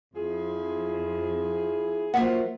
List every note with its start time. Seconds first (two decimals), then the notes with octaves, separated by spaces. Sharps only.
0.15 F2 F3 E4 G#4
2.14 F3 F#3 A#3 E5 F#5